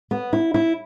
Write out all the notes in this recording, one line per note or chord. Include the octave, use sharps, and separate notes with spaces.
B3
E4
E4